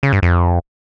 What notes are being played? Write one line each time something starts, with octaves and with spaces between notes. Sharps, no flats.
C#3
G2
F2